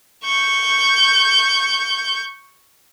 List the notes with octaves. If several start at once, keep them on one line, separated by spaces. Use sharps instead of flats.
C#6 G6